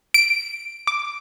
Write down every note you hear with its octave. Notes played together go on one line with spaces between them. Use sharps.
D7
D6